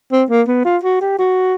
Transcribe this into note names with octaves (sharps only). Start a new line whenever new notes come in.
C4
A#3
B3
F4
F#4
G4
F#4